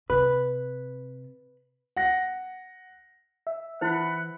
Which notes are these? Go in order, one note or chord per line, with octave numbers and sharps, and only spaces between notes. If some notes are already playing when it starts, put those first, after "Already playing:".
C3 B4
F#5 A#6
E5
E3 E4 C5 F#5 B5